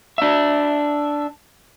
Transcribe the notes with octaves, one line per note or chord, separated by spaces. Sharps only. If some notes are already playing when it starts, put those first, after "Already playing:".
D4 E5